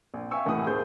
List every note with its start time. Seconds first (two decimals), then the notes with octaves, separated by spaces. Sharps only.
0.14 A#1
0.31 E5 F5 G5 G#5 C#6 E6
0.46 D#2 A2 E3 F#5 D#6
0.67 D#2 G#4 C5 G6